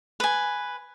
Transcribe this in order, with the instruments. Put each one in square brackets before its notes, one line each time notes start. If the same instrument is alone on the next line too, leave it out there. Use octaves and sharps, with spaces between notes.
[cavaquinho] B4 G#5